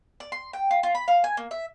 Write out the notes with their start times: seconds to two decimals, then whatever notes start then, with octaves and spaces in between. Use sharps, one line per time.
0.20 D5
0.32 C6
0.53 G5
0.71 F4
0.83 F4
0.95 B5
1.08 F5
1.24 G#5
1.37 A#3
1.51 E5